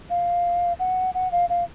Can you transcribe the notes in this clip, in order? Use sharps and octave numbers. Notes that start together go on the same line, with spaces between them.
F5
F#5
F#5
F5
F5